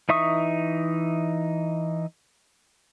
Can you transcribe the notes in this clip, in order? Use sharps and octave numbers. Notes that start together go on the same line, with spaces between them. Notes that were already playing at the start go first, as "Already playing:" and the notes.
E3 D#4 E5 C#6 D#6